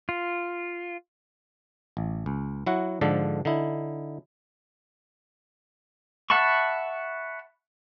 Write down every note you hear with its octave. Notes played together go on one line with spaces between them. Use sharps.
F4
A1
C#2
F#3 E4 F#4 F#5
G#2 D3 F3 A4 D5
D3 D#4 E4
E5 F#5 A5 B5 C#6